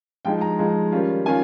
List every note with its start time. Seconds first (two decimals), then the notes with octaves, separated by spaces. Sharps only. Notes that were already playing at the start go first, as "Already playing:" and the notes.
0.25 F3 G#3 D#4 G5
0.41 A#5
0.58 F3 G#3 D#4
0.92 D#3 G3 C#4 F4
1.26 D#3 G3 C#4 F4 G#5